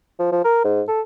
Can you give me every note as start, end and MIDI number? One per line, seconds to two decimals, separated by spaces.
0.19 0.29 53
0.32 0.42 53
0.45 0.60 70
0.65 0.82 44
0.88 1.01 69